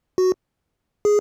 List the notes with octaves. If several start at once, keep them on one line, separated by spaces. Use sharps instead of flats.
F#4
G#4